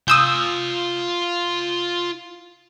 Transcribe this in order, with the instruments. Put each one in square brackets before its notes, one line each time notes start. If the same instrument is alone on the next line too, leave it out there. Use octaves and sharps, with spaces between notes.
[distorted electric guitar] F4 G#5 [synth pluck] D#6 E6 G6